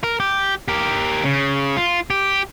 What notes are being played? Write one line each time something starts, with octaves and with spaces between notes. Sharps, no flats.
A#4
G4
G4 A#4
C#3
F4
G4